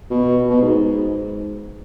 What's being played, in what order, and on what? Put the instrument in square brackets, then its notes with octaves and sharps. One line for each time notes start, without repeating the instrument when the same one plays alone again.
[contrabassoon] B2
B2
G#2